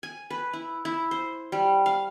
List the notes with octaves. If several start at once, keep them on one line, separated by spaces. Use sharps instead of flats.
G#5
B4
E4
E4
C5
G3
F5